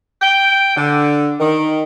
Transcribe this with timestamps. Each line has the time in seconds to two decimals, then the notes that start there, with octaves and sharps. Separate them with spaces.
0.22 G5
0.76 D3
1.40 D#3